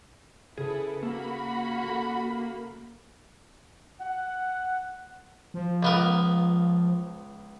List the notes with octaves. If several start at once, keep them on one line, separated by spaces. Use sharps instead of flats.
C#3 E4 G#4 A4 B4
A#3 F#4 B5 E6
A3
F#5
F3
C#2 B3 A#4